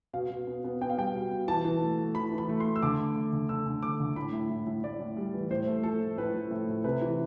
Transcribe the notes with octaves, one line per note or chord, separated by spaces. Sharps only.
B2 F5
B2
B3
B3
B3 G5
F5
G3 G5
B2
B2
E3 A5
E3
A3
A3
E3 B5
E3
B5
A3
A3 C6
E6
D3 D6
A3
A3
D3
D3 E6
D3
A3 D6
D3
A2 B5
A2
A2
A2
A2 D5
A2
G3
E3
A2 C5
A3
F3 A4
A3
A2 B4
F3
A2
A2
C3 B4
E3